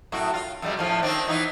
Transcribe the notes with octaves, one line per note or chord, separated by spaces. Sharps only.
F#2 A2 F#4
F4
F#2 G3 G#3
A2 F3 C#4
D#3 C4 D4
E3 B3 D#4